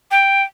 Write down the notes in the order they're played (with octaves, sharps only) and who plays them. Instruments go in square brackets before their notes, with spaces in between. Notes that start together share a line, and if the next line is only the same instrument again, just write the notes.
[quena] G5